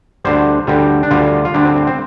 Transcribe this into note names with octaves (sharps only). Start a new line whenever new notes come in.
D2 D3 G3 C5
D2 D3 G3 G4
D4
D2 D3 G3 F4
F4
D2 D3 G3 D4
C4
C4
C4